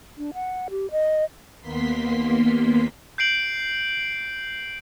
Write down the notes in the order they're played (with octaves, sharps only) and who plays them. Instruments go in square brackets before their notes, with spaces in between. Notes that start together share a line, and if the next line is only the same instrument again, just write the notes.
[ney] D4
F#5
G4
D#5
[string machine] D#2 A#3 B3 C6 B6
[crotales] G6 C7 D7 F#7